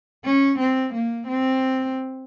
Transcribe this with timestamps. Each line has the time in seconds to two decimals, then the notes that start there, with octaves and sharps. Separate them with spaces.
0.25 C#4
0.59 C4
0.94 A#3
1.28 C4